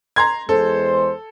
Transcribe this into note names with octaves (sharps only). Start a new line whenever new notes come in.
A#5 C6 G#6
E2 G#3 A4 C5